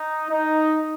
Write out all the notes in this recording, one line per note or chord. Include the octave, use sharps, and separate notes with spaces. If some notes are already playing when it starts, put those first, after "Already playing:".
Already playing: D#4
D#4